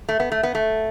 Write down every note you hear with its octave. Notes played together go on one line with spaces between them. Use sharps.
A3
B3
A3
B3
A3